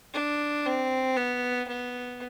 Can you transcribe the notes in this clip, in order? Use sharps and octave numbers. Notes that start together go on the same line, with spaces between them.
D4
C4
B3
B3